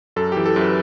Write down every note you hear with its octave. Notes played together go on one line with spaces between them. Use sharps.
F#2 A4
E3 G4
A4
F#2
B4